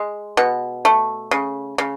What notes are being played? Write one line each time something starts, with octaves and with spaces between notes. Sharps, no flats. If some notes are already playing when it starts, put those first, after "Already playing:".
Already playing: G#3
B2
A3
C#3
C#3